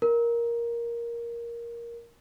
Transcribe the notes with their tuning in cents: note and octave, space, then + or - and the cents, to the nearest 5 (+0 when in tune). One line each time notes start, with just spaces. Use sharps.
A#4 +10